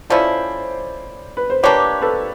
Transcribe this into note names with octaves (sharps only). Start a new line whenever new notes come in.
F3 A3 C#4 E4 C5 D5
B4
C5
A#3 D4 G4 B4 C#5
A4 B4